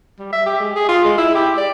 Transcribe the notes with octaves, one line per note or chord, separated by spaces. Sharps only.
G3
E5
G4
G#3
G#4
F4
G#3
E4
G4
D5